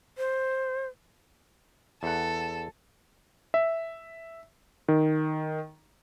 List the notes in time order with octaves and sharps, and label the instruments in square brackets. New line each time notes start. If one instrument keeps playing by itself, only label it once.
[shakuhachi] C5
[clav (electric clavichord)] E2 F#5 [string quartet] A4
[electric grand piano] E5
D#3